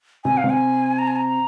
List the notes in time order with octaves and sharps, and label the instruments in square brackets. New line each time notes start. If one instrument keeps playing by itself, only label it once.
[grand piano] C3 [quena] G#5
[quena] F5
[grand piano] C3
[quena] G#5
A#5
G#5
A#5